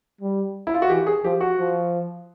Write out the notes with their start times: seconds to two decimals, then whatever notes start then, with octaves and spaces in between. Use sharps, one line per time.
0.21 G3
0.67 E4
0.74 F4
0.82 F#4
0.89 E3 G4
1.07 G#4
1.24 F3 G4
1.41 F#4
1.59 F3